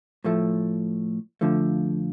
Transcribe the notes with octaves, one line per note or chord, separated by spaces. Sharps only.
A2 F3 A3
F2 D3 F3 A3